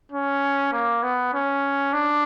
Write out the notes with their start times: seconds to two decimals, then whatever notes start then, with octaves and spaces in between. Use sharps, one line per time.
0.12 C#4
0.73 A#3
1.03 B3
1.33 C#4
1.93 D4